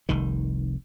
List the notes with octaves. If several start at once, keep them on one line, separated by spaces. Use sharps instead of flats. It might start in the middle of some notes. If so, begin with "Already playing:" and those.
F1 C2 D#3